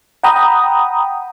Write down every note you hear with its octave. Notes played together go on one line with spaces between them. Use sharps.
F#5 G5 A#5 B5 D#6